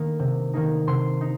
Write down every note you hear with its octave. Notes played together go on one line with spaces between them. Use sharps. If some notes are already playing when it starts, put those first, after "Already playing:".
Already playing: D#3 A#3 D#4
C3
D#3 A#3 D#4
C3 C6
D#4